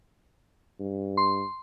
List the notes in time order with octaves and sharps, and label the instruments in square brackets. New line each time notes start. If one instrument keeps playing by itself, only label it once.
[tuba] G2
[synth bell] C6